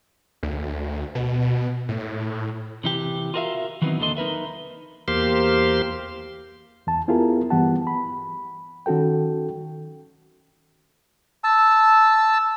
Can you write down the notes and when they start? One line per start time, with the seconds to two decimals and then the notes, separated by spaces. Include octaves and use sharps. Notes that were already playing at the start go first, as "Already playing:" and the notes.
0.43 D2
1.15 B2
1.89 A2
2.84 C3 E3 G4
3.34 F4 F#4 A#4 D5 E5 F5
3.82 D#3 E3 F#3 B3 C4 D#4
3.99 D#2 D3 A#3 A4 D#5 C6
4.17 D#4 A#4 B4 E5
5.08 E2 A#3 G4 C5 F5 C6
6.87 E2 A5
7.08 B3 E4 F4 G4 G#4 A#4
7.50 G2 E3 B3 G4 F#5 A5
7.87 B5
8.86 D#3 C#4 F#4 A4 G5
11.44 A5 E6